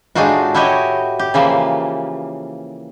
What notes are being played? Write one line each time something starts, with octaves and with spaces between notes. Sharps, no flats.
A2 G#3 D4 D#4 F4 F#4
E4 F#4 G4 C#5 D#5
G4
C#3 E3 F3 A#3